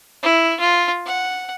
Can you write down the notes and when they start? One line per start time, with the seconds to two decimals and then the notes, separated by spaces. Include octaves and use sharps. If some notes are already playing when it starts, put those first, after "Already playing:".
0.23 E4
0.60 F4
1.06 F#5